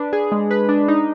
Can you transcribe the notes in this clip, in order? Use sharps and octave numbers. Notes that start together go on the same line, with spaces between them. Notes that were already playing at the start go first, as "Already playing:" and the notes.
Already playing: D4 B4
G#4
G#3
B4
D4
D#4